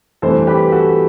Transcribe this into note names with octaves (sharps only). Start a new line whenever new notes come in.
G2 E3 A3 C4 A4 C5
G4 B4
F#4 A4